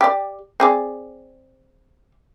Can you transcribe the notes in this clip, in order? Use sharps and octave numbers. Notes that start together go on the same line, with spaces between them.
G4 D5
C4 G#4 D5